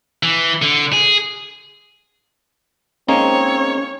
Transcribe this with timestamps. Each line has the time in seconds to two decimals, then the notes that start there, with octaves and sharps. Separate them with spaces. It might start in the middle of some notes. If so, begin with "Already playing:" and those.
0.23 E3
0.62 D3
0.93 G#4
3.08 G#3 A#3 C4 C#4 D#4 C#5